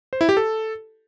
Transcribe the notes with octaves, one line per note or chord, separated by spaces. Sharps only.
C5
E4
G4
A4